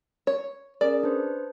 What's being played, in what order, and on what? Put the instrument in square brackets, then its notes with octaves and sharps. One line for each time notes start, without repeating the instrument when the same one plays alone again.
[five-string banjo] C#5
[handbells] C#4 G#4 A#4 [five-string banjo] D5
[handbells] D4 B4 C5